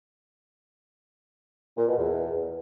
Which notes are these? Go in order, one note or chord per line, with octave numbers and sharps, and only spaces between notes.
A#2
B2
E2